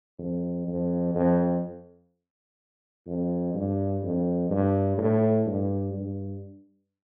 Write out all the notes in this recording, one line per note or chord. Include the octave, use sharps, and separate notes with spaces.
F2
F2
F2
F2
G2
F2
G2
A2
G2
G2